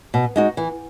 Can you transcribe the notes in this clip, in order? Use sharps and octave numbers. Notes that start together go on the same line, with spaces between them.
B2
G#3 D#4 F#4
E3